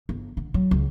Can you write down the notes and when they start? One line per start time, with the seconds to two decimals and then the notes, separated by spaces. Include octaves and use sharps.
0.09 G1
0.37 D3
0.54 F#3
0.71 C#2